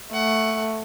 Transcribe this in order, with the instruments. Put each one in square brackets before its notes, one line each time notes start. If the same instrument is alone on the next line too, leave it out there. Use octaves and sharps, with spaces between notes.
[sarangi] A3 [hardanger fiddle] F#5